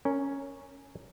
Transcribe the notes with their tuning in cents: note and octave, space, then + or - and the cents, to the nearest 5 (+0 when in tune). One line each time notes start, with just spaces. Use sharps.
C#4 +0 A#4 -5